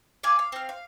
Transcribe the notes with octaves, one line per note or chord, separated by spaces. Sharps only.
D5 F5 G#5
F5
C4 F5
F5